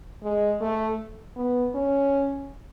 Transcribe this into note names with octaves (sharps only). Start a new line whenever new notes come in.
G#3
A3
B3
C#4